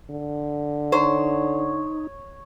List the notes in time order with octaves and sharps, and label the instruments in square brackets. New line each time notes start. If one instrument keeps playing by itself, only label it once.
[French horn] D3
[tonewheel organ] D#4 [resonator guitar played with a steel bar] C5 [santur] C#5